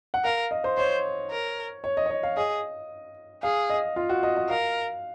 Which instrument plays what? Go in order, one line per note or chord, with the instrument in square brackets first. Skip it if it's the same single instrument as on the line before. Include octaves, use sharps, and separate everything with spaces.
[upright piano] F#5
[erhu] A#4 [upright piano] F5
[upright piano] D#5
C5
[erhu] C5 [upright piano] C#5
[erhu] A#4
[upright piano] C#5
D#5
C#5
D#5
F5
[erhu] G#4 [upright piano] D#5
[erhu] G#4 [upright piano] F5
[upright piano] D#5
F4
F#4
D#5
D#5
[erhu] A#4 [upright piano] F5